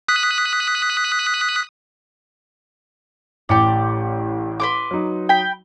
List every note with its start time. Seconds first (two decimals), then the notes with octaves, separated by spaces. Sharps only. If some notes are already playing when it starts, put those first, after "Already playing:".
0.08 D#6 F#6 B6
3.49 A1 A2 G4 D5 C#7
4.60 B4 C6 D6
4.91 F#3 D#4
5.29 G5 B5